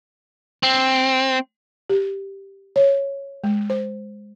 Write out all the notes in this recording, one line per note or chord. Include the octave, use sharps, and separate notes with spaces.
C4
G4
C#5
G#3
C5